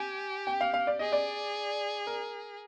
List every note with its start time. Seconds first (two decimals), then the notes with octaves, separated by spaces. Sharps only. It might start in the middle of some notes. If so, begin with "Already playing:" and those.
Already playing: G4 G#5
0.47 G5
0.61 F5
0.74 F5
0.87 D5
0.99 G#4 D#5
1.12 D5
2.07 A#4